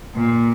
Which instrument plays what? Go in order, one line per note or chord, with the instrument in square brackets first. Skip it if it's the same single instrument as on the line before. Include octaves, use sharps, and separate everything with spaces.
[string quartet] A#2